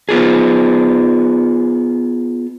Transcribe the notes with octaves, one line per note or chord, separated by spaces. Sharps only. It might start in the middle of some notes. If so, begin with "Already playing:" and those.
B3 F4 G#4